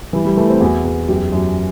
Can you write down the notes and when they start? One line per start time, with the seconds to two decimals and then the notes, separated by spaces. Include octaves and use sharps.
0.13 E3 G3
0.25 G3
0.37 E3 A3
0.50 C4
0.61 E2 F#4
0.85 E2
1.09 F#2 G4
1.32 F#2